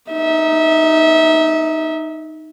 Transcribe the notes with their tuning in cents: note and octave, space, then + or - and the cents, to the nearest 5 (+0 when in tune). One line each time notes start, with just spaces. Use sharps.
D#4 +0 E5 -25